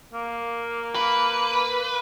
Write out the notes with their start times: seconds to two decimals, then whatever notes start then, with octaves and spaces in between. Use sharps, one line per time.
0.13 A#3
0.95 B4